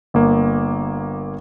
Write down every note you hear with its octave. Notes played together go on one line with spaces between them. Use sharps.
G1 A#3